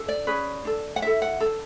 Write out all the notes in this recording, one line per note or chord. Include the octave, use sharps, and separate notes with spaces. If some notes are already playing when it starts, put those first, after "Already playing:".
Already playing: D4 A4
D5
C#4 G#4 B4
D4 A4
F#5
E4 A4 E5
F#5
D4 A4